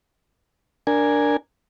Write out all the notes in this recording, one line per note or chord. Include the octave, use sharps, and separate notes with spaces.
D4 A#4 G#5